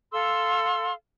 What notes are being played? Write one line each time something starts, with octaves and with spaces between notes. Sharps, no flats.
A4 F5 C6 E6